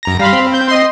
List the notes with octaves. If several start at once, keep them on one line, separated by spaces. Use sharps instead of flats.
F#2 A#5 A#6
G3 F5 B5 C6 A#6
C4
G6
D#5 C6